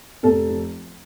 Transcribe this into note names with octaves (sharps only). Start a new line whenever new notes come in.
F1 A4
F3